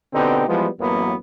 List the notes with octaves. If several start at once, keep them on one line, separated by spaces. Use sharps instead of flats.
B2 D3 B3 C4 D#4 G4
E3 F3 G3 G#3 B3
A1 F#2 F#3 A#3 B3